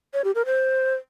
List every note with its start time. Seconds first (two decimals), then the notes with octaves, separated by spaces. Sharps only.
0.14 C#5
0.24 G4
0.35 A#4
0.46 C5